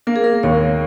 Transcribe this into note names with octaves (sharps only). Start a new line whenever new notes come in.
A#3 A#4
G#4
A#4
D#2 C#5